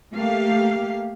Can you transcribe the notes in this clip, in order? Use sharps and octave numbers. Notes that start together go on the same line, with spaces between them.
A3 A#3 G4 F5